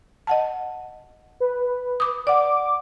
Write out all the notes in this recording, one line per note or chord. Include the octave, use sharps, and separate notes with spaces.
D#5 F#5 A5
B4
D6 D#6
D5 F#5 D6